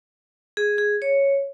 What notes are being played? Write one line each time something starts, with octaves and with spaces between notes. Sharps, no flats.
G#4
G#4
C#5